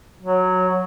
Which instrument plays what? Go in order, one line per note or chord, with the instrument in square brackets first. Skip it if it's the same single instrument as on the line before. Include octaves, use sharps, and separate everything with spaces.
[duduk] F#3